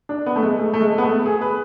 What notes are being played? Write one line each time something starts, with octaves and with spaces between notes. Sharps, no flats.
D4
B3
A3
G#3
A3
A3
G#3
B3
A3
G#4
B4